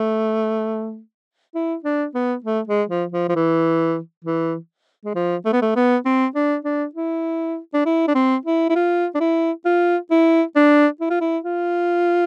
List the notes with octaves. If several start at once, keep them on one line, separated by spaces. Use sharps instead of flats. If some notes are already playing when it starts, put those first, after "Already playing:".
Already playing: A3
E4
D4
B3
A3
G#3
F3
F3
F3
E3
E3
G#3
F3
A3
B3
A3
B3
C4
D4
D4
E4
D4
E4
D4
C4
E4
E4
F4
D4
E4
F4
E4
D4
E4
F4
E4
F4